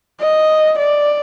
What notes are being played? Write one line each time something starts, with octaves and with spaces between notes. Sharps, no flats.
D#5
D5